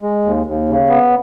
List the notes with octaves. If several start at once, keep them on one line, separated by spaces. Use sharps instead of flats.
G#3
D#2
D#2
C#3
B3